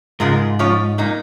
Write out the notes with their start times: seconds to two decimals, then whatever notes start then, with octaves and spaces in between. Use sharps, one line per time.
0.20 G#2 C#3 G#3 F4 A#4
0.59 F3 C#4 F4 C#5
0.98 A#2 A#3 D#4